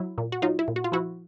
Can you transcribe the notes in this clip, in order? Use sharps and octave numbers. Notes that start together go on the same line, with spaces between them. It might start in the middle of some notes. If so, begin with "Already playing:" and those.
Already playing: F#3 E4
A#2
F#4
F#3 D#4 F4
E4
A#2
F#4
F4
F3 E4 F#4